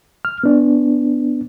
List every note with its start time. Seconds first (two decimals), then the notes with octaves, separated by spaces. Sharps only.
0.25 F6
0.44 B3 D4